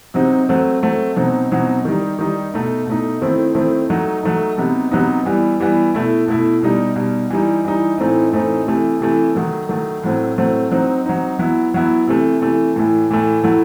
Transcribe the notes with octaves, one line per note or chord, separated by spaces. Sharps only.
C3 F#3 C4 D#4
F#3 A3 C4
F#3 A3 C4
B2 F#3 C4 D#4
B2 F#3 C4 D#4
D#3 G3 D#4
D#3 G3 D#4
B2 A3 D#4
B2 A3 D#4
D#3 A3 C4 E4
D#3 A3 C4 E4
F#3 A3 D#4
F#3 A3 D#4
C3 F#3 B3 D#4
C3 F#3 B3 D#4
E3 G3 B3
E3 G3 B3
B2 A3 E4
B2 A3 E4
B2 G3 D#4
B2 G3 D#4
E3 G3 D#4
E3 G3 D#4
A2 E3 A3 C4 D#4
A2 E3 A3 C4 D#4
C3 E3 A3
C3 E3 A3
D#3 F#3 A3
D#3 F#3 A3
A2 F#3 A3 C4
A2 F#3 A3 C4
F#3 C4 D#4
F#3 C4 D#4
F#3 B3 E4
F#3 B3 E4
C3 E3 A3
C3 E3 A3
A2 E3 A3
A2 E3 A3
A2 F#3 A3 E4